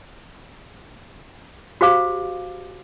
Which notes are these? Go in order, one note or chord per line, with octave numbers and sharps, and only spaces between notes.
F#4 G4 C5 F5 D6